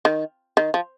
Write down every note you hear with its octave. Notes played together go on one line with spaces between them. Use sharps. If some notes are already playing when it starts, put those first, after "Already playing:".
D#3
D#3
F3